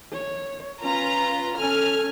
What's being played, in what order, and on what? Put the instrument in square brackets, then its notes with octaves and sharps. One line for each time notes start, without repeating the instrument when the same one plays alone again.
[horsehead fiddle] C#5
[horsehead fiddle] C#4 B4 [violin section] F4 A#5
[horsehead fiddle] C#4 A4 [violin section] G#5 F6